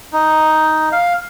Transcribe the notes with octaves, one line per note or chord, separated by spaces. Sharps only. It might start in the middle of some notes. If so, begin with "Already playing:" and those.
D#4
F5